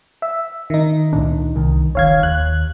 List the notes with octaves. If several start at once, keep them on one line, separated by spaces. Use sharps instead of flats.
E5
D#3 D#4
C#2 A#2 D4
C2 D#3
F1 C3 D#3 C#5 F5 G#6
D#2 F#6